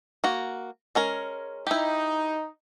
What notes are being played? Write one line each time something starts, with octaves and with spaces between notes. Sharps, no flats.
A#3 F#4
G#3 C#4 A#4
D#4 E4 G4